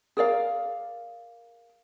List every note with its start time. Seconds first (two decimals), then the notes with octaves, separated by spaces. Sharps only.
0.17 G#4 A#4 D5 F5